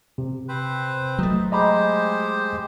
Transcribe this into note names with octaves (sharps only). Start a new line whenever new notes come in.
C3
C4 B4 C5
F#3 A3 D#4
G#3 G4 C5 D#5 A#5 B5